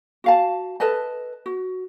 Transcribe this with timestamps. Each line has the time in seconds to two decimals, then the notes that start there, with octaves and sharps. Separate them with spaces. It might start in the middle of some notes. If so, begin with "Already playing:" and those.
0.24 F#4 F5 A5
0.80 A4 B4 D#5 A5
1.46 F#4